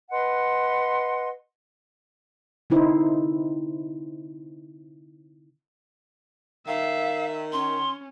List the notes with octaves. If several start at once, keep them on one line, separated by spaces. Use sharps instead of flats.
B4 D#5 F#5 C6
D3 C4 D#4 E4 C5
D#3 E5 F5
C#4 C6